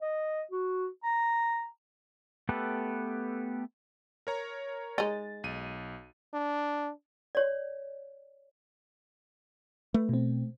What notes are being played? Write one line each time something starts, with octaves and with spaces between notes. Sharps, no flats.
D#5
F#4
A#5
A3 B3 G4 A4 B4
A#4 C#5 A#5
G#3 D#4 A6
B1 D#7
D4
C#5 D5
A3 B4
B2 C4